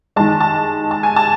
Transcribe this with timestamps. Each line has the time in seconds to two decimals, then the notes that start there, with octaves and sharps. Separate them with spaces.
0.16 D#3 G#3 A5
0.40 A5
0.91 A5
1.03 G#5
1.16 A5